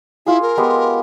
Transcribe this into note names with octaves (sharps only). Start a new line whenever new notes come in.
E4 F4 G#4
A#4
G#3 B3 G4